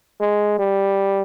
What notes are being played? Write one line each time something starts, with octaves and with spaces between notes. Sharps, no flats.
G#3
G3